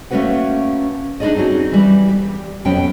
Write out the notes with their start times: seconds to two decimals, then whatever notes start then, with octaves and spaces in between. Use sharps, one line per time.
0.11 A3 A#3 C#4 F#4 B4 F#5
1.20 D4 D#4 F4 G#4 D5 D#5
1.36 C4 C#4 D#4 F#4 G#4
1.72 E3 G3
2.09 G4
2.65 F2 B2 F#3 B3 C#4 G5